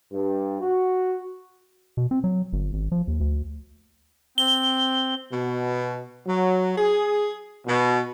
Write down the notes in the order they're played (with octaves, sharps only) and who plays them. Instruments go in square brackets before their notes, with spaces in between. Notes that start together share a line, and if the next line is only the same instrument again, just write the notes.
[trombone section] G2
F#4
[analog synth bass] B2
C4
F#3
G1
G#1
F3
D#2
D2
[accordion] C4 [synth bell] G7
[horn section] B2
F#3
G#4
B2